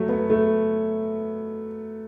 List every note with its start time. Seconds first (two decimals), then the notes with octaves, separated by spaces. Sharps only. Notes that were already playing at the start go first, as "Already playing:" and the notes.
Already playing: F#3 A3
0.09 B3
0.30 A3